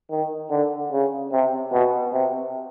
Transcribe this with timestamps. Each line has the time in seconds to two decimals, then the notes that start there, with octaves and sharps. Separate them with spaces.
0.10 D#3
0.50 D3
0.92 C#3
1.32 C3
1.73 B2
2.13 C3